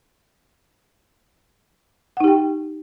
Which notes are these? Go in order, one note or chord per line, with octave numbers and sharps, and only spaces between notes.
D#4 G4 F#5 G5